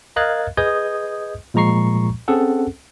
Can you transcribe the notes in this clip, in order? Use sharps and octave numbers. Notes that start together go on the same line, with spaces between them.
A#4 D#5 F5 F#6 G#6 A6
G#4 B4 D#5 D#6 G6 G#6
A#2 F3 G#3 A#5 C#6 C7
C4 C#4 G#4 A4 F#5